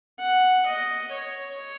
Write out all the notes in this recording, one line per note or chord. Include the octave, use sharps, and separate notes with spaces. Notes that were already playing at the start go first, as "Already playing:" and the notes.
F#5
D#5
C#5